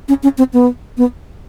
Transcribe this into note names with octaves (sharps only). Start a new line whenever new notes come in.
C#4
C#4
C4
B3
B3